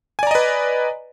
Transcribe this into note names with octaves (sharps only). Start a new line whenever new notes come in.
B4 D5 D#5 G#5 A#5